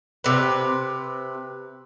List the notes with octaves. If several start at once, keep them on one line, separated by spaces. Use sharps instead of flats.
C3 B4